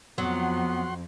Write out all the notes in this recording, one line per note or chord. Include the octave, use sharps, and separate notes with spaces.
F2 F#3 B3 F#5 C6